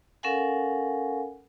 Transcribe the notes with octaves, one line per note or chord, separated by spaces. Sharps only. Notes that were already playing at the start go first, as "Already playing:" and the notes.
C#4 A4 A#4 F5 F#5 G#5